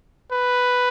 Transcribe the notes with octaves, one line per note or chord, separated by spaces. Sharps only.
B4